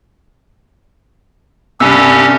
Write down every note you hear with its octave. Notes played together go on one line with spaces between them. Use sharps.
C2 G2 C#4 G4 E6